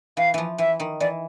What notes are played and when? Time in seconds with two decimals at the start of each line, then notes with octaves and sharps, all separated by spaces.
0.17 E3 F5
0.34 E3 F3
0.58 E3 E5
0.80 D#3
1.00 E3 D5